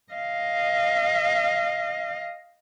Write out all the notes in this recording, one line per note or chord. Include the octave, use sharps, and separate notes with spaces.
D#5 F5